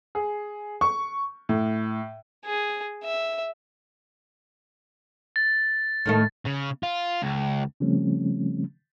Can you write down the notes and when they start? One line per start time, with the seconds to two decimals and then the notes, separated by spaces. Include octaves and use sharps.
0.15 G#4
0.81 C#6
1.49 A2
2.46 G#4
3.04 E5
5.36 A6
6.06 A2 D#3 A3
6.46 C#3
6.83 F4
7.23 C#2
7.80 C#3 F3 G3 A3 C4 C#4